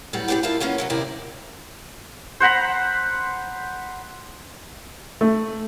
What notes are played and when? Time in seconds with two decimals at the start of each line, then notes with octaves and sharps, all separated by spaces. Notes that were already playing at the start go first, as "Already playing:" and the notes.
0.13 A2 F#3 G3 B3
0.28 B3 C4 D4 F#4 G4
0.43 E4 F4 A#4 E5 F5 A5
0.60 F#3 A#3 B3 C#4 F4
0.78 C3 F#3 C#4
0.90 D#2 C3 E4 A#4 D5
2.40 C5 F#5 A#5 B5
5.21 A3